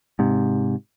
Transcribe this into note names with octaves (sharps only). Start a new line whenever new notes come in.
G#2 C3